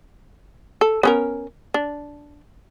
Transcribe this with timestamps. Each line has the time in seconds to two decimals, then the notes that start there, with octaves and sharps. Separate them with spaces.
0.81 A4
1.03 B3 C#4 A#4
1.74 D4